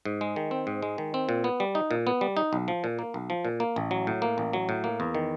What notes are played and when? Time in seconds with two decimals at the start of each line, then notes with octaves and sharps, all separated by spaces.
0.05 G#2
0.21 G#3
0.36 D#3
0.51 C4
0.67 G#2
0.83 G#3
0.98 D#3
1.14 C4
1.29 A#2
1.44 B3
1.60 G3
1.75 D#4
1.91 A#2
2.07 B3
2.21 G3
2.37 D#4
2.53 B1
2.68 F3
2.84 A#2
2.99 A#3
3.14 B1
3.30 F3
3.45 A#2
3.60 A#3
3.76 A1
3.91 F#3
4.07 A2
4.22 A#3
4.38 A1
4.53 F#3
4.69 A2
4.84 A#3
5.00 E2
5.15 D#3